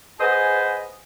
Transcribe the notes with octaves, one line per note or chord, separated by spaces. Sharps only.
G#4 B4 C5 D#5 F#5 G#5